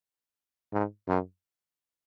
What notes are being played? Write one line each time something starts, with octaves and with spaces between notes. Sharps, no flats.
G#2
F#2